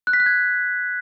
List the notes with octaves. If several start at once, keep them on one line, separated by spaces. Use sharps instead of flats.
F#6
B6
F#6
G#6